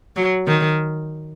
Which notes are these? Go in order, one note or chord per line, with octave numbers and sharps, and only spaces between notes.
F#3
D#3